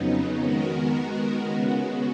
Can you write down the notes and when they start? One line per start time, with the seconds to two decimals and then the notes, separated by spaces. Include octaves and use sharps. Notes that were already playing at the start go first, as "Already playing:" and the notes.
Already playing: F2 C#3 F#3 B3 D#4
0.42 D#3 G#3 B3 F#4 A#4
1.43 C#3 G#3 B3 F#4